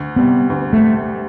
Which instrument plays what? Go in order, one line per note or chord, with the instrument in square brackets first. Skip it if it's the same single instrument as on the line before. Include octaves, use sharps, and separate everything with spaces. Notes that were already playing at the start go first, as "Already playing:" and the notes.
Already playing: [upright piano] D2
[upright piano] C3 G3 [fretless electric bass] B3
[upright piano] D2
[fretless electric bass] A3